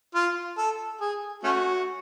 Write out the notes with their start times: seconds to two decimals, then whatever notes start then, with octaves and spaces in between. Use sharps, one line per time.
0.15 F4
0.58 A4
1.01 G#4
1.44 A3 C#4 F#4